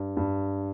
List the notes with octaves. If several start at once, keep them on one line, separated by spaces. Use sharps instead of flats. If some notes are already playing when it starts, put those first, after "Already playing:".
Already playing: G2
G2